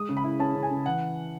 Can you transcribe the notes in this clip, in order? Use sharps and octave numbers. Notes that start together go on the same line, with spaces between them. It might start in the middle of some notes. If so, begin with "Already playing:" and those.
Already playing: G#3 D#6
C#3
B5
E4
C#4 A5
C#3
G#5
C#3
E3 F#5